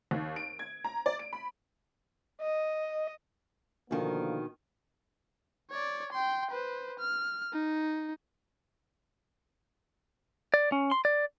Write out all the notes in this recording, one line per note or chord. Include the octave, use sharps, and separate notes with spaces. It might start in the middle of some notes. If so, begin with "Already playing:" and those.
D#2
D7
G#6
A#5
D5
D7
B5
D#5
B2 D3 D#3 F3 A#3
C#5 D5
G5 C6
B4 C5
F6
D#4
D5
C#4
C6
D5